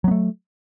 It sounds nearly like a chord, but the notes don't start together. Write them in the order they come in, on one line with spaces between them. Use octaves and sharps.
F#3 B3 A3